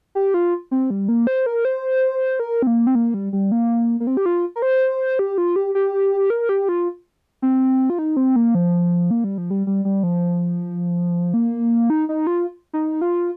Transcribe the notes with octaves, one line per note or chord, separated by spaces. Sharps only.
G4
F4
C4
G3
A#3
C5
A#4
C5
A#4
C4
A#3
C4
A#3
G3
G3
A#3
A#3
C4
G4
F4
A#4
C5
G4
F4
G4
G4
A#4
G4
F4
C4
F4
D#4
C4
A#3
F3
A#3
G3
F3
G3
G3
G3
F3
A#3
D#4
D#4
F4
D#4
F4